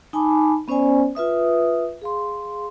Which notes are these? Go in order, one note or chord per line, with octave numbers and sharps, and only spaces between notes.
D#4 G#5 A5 B5 D6
B3 C#4 C5 D5 G#5
F4 B4 E5 D#6
G#4 F5 C6